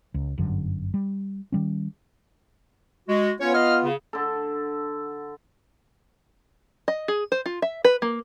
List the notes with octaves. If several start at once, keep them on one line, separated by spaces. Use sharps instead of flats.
C#2
G1 F#2 D3
G3
D#3 G3 C#4
G#3 F#4
B3 C#4 F4 C#5
D#5 F5 F6
C#3
D3 A4
D#5
G#4
C5
F4
E5
B4
A#3